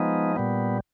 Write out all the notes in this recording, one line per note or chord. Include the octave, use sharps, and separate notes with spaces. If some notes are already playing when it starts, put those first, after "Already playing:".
Already playing: F3 G#3 B3 D#4
A#2 G3 B3